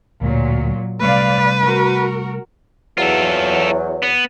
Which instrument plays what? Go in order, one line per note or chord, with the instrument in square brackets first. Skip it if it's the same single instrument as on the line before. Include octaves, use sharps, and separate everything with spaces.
[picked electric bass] D1 D2 [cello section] A#2 F#3
[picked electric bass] C3 G3 A3 [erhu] B4 [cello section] D5 F5
[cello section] F#4 A#4
[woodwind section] E2 F#3 [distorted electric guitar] F4 A4
[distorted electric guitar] B3